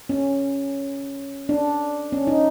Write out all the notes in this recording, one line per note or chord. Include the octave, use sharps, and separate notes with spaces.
C#4
D4
C#4
D#4